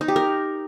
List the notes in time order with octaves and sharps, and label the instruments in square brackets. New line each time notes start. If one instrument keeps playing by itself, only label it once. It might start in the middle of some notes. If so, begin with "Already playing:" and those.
[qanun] D#4
G4
A#4